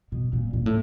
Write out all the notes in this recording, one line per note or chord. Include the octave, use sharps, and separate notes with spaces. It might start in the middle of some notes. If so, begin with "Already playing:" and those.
B2
A#2
A#2
A2